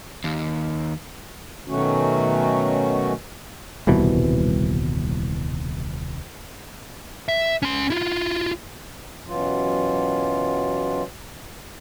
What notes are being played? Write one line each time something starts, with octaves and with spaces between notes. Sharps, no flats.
D#2
B2 D#3 F#3 A3 C#4 F#4
D#1 C2 B2 E3
E5
C#4 C6
E4 F4
F#2 B2 E3 F#3 F4